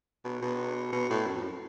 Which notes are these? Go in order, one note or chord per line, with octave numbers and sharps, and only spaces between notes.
B2
B2
B2
A2
F#2
F2
F#2